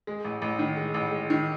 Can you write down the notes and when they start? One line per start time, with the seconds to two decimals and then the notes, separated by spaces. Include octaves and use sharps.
0.07 G#3
0.25 A1
0.42 A1
0.59 D#3
0.77 G#3
0.94 A1
1.12 G#3
1.30 D#3